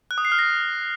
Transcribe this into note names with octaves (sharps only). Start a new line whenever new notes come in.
F#6
D#6
C7
F6
A#6